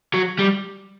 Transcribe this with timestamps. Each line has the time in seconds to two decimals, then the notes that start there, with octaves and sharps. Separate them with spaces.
0.14 F#3
0.39 G3